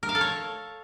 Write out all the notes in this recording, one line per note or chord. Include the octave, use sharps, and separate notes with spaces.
A#4
F5
A4
C#5